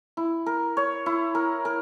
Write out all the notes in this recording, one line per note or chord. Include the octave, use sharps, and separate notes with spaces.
E4
A#4
C#5
E4
A#4
A#4